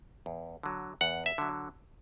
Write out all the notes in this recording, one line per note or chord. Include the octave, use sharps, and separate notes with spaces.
E2
D3 F#3
E2 F#5
E5
D3 F#3